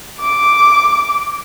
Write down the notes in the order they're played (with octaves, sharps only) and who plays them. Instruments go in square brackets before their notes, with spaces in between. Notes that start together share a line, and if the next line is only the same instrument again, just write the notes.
[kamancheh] D6